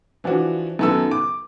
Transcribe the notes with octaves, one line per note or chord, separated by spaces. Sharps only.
E3 F3 D4 F#4
F#2 D#3 B3 A4 E6
D6